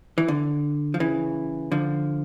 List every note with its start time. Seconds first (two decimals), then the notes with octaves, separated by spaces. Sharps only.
0.18 E3
0.28 D3
0.94 F3
1.00 C#3 E3
1.72 D3 F3